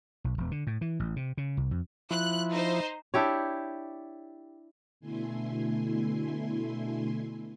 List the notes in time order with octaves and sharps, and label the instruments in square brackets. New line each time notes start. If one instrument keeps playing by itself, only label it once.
[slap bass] B1
E1
D3
A2
E3
A1
C3
C#3
C2
F2
[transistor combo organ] F3 E4 [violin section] F#6
[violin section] D#4 C5
[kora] D4 E4 G4 C#5
[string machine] B2 D3 A3 E4 G#5 C6